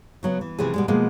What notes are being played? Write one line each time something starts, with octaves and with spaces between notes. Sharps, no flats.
C#3 F#3 B3
E3
C3 E3 F3 A3 G#4
B2 G3 G#3
B2 F3 G#3 A#3